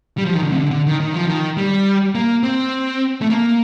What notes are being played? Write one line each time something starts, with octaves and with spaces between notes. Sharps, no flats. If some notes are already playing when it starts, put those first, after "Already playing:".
G3
F3
D#3
D3
C3
D3
D3
D#3
D#3
F3
D#3
G3
A#3
C4
A3
A#3